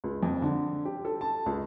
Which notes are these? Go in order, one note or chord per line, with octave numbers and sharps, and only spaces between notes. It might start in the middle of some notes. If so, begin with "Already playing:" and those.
C#2
F2
D3
G4
A4
A5
C#2